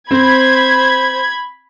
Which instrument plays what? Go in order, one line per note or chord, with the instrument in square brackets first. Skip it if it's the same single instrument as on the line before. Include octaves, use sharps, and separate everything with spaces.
[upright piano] C4 [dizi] C5 [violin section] B5 G#6